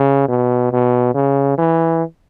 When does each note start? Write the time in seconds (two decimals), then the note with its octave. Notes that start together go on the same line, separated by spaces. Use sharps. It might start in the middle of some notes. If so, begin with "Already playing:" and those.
Already playing: C#3
0.28 B2
0.72 B2
1.14 C#3
1.58 E3